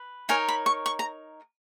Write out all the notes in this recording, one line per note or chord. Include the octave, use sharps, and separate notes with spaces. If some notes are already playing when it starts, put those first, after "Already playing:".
Already playing: B4
D#4 A#4 C#5 G#5
B5
C#6
C#6
A#5